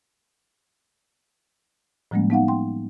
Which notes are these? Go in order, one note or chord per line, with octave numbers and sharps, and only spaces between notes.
A2 F3 G3 G#3 A#3 C#4
B3 D#4 F5 F#5
G5 C6